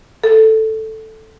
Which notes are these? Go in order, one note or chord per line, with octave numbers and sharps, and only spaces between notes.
A4